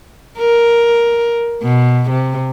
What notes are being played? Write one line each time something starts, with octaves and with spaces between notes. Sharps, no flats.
A#4
B2
C3